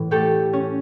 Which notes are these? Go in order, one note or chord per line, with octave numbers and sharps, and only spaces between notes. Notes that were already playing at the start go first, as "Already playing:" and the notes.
Already playing: A2 E3
A3 G4 A4
C#4